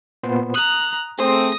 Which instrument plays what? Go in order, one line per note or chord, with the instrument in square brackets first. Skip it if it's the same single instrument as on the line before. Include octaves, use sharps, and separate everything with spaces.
[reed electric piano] A#2 B3 C5
[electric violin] A#5 F#6 [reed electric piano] D#6
[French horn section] A3 C4 [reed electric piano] G#4 C5 [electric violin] D#6 A#6